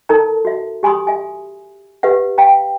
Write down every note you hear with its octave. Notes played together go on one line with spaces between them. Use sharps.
D#4 A4 A#4 A5 A#5
F#4 E5
G4 G#5 B5 C6 D#6
E5 G#5
G4 B4 E5 F#5
F5 G5 A#5